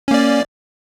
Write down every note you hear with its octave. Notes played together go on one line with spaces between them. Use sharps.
A#3 C#4 D5